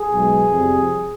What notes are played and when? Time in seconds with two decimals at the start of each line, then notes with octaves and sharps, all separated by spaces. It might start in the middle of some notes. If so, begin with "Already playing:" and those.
Already playing: G#4
0.10 B1 B2 G#3
0.49 F2 C3 G3 C4